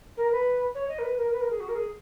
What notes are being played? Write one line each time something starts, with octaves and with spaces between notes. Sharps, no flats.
A#4
B4
C#5
D#5
A#4
B4
A#4
B4
A#4
G#4
F#4
A#4
G#4